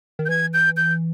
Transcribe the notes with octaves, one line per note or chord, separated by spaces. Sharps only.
D#3
G6
E3 G#6
G6
G6